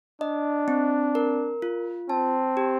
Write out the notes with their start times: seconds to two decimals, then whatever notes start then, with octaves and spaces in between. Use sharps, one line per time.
0.21 D4 D#5
0.68 C4
1.15 A#4
1.62 F4
2.09 C4 A5
2.57 G4